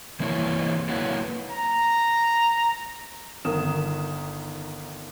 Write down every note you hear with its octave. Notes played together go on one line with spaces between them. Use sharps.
E3 A#3 C4 E4 C#5
F#3 A#3 E4 B4 C#5 F#5
A#5
G1 D#3 A#4 D#6 E7